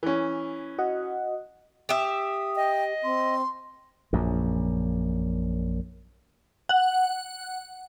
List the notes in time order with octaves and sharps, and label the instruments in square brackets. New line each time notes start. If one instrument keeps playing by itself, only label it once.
[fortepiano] E3 C#4
[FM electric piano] F#4 D#5 F#5
[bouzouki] G4 E5 [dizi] D#6
[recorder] D#5 [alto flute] G5
[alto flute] C4 [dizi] C6
[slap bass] A#1 F#2
[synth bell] F#5